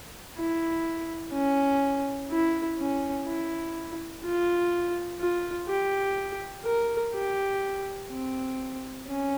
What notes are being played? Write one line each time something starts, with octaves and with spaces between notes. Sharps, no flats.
E4
C#4
E4
C#4
E4
F4
F4
G4
A#4
G4
C4
C#4